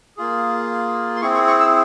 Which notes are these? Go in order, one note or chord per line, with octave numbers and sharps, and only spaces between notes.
A#3 F4 G#4
C6
C4 E4 G#4 C#6
C#6
C#6
E6